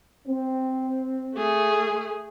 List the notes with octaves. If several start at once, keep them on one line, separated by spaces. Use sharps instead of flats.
C4
A3 G#4